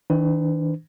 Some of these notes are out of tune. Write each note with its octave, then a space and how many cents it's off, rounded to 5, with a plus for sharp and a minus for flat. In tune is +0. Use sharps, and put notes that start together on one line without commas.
D#3 +45 D4 +0 B4 +45